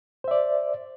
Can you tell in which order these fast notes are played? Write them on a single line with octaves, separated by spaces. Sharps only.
C5 E5 D5